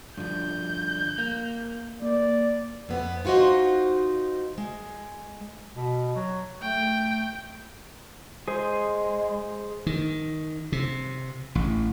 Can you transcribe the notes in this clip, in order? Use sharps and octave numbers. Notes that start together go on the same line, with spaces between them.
G2 D3 F3 G6
A#3
A#3 D5
F2 B3
D#4 F4 F#4 C5 D#5
G#3
B2
F#3
A3 G5
G#3 G#4 C5
D#3
C3
A1